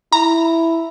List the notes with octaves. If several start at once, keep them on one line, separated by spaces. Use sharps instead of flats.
E4 A#5